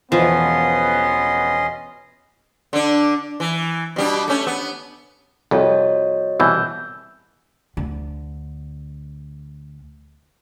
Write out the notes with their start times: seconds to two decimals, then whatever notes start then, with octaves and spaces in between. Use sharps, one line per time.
0.12 E1 F3 B3 C#4 D#5 C6
2.73 D3 D4
3.40 E3
3.96 B2 G3 D4
4.28 A3 C#4
4.47 B3
5.51 C2 F2 F#4 C#5 D#5
6.40 C2 B2 E3 E6 G6
7.77 D2 D3